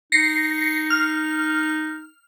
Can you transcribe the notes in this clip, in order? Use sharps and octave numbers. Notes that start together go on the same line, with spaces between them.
D#4 A#6 C7 C#7
F6